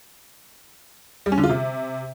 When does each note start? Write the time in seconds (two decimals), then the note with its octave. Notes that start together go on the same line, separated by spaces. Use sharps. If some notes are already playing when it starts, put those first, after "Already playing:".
1.26 G3
1.32 C#4
1.38 D3
1.44 F4
1.49 C3